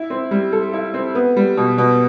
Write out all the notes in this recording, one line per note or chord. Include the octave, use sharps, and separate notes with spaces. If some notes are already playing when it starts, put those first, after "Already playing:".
Already playing: E4
C4
G3
A4
E4
C4
B3
G3
B2
B2